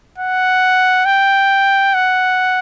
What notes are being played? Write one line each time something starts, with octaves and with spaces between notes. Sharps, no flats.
F#5
G5
F#5